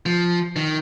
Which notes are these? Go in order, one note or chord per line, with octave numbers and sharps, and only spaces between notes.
F3
D#3